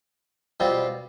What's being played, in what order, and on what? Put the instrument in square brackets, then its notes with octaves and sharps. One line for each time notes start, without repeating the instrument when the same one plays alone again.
[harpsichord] B2 G3 C4 F4